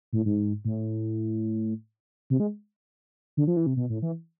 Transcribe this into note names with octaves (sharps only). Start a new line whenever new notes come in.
A2
G#2
A2
C3
G#3
D3
F3
E3
C3
B2
A2
E3